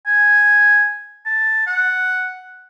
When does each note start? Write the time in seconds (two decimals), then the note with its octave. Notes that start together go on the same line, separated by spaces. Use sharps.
0.06 G#5
1.26 A5
1.66 F#5